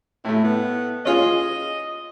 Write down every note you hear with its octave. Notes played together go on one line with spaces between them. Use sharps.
A2 A3 E4
B3
C#4 F4 G#4 D#5